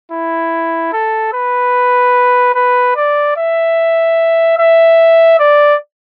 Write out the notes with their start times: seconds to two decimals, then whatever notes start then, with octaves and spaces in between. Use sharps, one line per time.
0.12 E4
0.93 A4
1.33 B4
2.55 B4
2.96 D5
3.37 E5
4.58 E5
5.39 D5